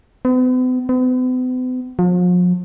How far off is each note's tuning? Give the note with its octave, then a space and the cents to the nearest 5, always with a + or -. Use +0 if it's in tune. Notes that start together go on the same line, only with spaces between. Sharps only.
B3 +45
B3 +45
F3 +40